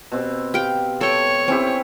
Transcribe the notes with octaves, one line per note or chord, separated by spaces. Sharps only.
B2 C4 G4
G4 F5 G5
A4 C#5 G5
C4 C#4 E4 G4